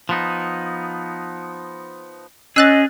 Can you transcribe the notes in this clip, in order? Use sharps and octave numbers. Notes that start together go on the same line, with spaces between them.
F3 B3 D#4
C#4 G#4 D#5 E6 F#6 A6